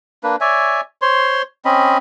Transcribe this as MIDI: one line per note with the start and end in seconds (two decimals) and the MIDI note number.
0.24 0.36 58
0.24 0.36 62
0.24 0.36 71
0.41 0.81 73
0.41 0.81 74
0.41 0.81 76
0.41 0.81 80
1.02 1.42 72
1.02 1.42 73
1.02 1.42 84
1.65 1.98 60
1.65 1.98 61
1.65 1.98 75
1.65 1.98 83